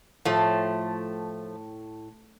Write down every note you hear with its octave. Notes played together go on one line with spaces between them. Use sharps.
A2 F3 A3